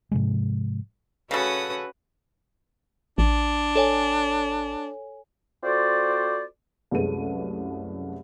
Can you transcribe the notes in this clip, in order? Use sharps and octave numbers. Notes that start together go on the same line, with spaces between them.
G#2 C3 F3 G#3
C#3 C#4 F#4 A4 B4 D#6
A1 D4
A4 C#5 G#5
C4 F4 F#4 A4 C5 D5
C2 F#2 G#3 A3 B4 D#7